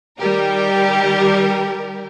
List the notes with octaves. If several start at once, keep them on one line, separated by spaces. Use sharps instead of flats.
D#3 G3 G4 A#4